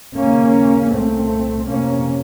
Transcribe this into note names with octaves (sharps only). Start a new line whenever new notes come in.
D#2 C#3 A#3 C#4
C2 A#2 A3 C4
F2 C3 A#3 C#4